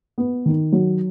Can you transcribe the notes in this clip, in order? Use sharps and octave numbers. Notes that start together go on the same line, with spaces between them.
B3
D#3
F#3